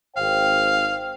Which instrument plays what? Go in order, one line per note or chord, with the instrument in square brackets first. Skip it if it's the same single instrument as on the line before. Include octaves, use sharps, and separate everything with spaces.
[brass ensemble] G#1 C5 G5 [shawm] F5